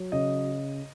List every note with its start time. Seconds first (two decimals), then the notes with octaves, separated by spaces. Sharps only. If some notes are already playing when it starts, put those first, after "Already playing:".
Already playing: F#3
0.12 C#3 D#5